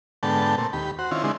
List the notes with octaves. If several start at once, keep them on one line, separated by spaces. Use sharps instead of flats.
G#2 D3 B3 A4 G5 A5
A#2 A3 C4
D#2 G4 B5
F#4 C5
D#3 C4 C#4 E4 F4
D3 G#3 C4 D#4 E4